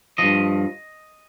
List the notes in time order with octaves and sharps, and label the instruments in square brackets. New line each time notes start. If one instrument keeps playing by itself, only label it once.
[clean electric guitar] G2 F3 D#5